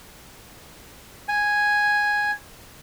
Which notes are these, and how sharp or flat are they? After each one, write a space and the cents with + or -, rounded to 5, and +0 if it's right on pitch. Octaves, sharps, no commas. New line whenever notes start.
G#5 +0